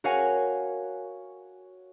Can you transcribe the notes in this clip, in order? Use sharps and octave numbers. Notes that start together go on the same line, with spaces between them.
F#4 A#4 C#5 F5 F#5 G#5